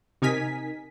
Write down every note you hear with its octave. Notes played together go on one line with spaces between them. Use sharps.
C3 D#4 A#4 G#5 B6